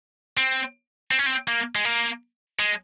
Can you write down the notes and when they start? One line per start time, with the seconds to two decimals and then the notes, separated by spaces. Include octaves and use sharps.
0.37 C4
1.11 C4
1.19 C#4
1.26 C4
1.48 A#3
1.75 G#3
1.85 A#3
2.59 G#3